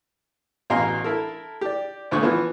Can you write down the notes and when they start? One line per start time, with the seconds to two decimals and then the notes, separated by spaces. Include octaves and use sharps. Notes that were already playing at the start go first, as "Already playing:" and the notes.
0.70 A1 B2 F5 G#5 A#5 C6
1.04 E4 A4 A#4
1.61 G4 D5
2.11 G#1 D2 A#2 A3 C#6
2.23 E3 F3 B3